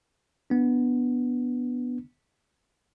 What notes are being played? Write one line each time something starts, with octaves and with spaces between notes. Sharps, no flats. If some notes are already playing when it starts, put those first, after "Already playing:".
B3 D4